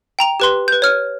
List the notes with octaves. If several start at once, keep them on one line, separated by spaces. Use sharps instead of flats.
G5 A#5 F7
G4 B4 C6
B4 G6
C#5 F6